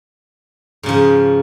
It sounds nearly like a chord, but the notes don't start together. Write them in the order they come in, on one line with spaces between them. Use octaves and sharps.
G#2 C#3 F3